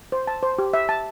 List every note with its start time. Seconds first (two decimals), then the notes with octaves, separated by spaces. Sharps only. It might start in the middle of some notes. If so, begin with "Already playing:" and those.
0.12 C5
0.27 A5
0.43 C5
0.59 G4
0.74 E5
0.89 A5